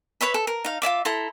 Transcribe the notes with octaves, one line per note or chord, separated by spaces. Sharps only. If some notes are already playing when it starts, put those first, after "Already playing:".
B4 C#5 E5 B5
A4
A#4
D#4 F5
F4 D5 E5 D6
E4 A4 A#5 C6